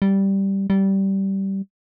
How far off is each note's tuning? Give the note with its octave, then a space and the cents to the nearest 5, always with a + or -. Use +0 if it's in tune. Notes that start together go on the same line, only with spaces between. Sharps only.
G3 -5
G3 -15